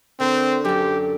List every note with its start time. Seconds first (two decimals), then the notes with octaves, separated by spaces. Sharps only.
0.20 D3 C4 F#4 A#4
0.65 F#2 G4 A4